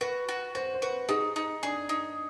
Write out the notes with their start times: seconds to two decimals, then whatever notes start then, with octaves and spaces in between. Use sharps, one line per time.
0.01 F#4 B4
0.29 F#4
0.55 F#4 C5
0.74 C5
0.82 F#4 B4
1.09 D#4 G#4
1.36 D#4
1.63 D4 G#4
1.89 D#4